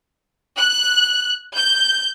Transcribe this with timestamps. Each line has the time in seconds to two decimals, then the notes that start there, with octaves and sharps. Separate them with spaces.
0.58 F#6
1.56 G6